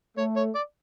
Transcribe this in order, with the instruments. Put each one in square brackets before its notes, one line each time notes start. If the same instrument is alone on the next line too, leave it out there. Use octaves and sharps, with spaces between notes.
[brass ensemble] A3 [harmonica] C#5
[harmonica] C#5
D5